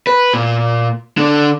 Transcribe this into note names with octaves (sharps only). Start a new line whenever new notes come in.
B4
A#2
D3 D4